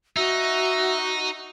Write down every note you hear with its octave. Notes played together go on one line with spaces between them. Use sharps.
D#4 F#4 E5